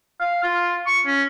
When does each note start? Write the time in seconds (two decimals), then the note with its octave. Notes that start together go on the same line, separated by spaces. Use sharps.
0.21 F5
0.44 F4
0.87 C#6
1.06 C#4